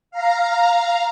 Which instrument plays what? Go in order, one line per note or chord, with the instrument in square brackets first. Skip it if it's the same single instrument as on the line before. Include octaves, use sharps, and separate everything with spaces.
[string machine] F5 A#5